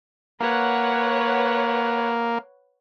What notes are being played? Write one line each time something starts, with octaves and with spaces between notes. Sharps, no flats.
A#3 B4 C#5 F#5